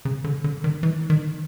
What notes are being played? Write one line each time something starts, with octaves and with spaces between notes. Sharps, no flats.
C#3
D3
D3
D#3
E3
D#3